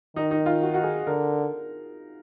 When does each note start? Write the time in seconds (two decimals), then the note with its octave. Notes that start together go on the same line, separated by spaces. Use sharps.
0.16 D#3 D#4
0.31 D#4
0.46 F4
0.62 F#4
0.74 F#4
0.84 G#4
1.07 D3 A#4